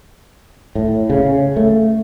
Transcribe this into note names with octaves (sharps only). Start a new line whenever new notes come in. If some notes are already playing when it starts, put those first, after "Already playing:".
A2
C#3
A3